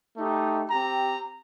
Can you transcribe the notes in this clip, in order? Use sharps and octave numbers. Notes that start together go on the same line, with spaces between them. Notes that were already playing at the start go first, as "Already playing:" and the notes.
A3 D#4 G4
C4 G4 A#5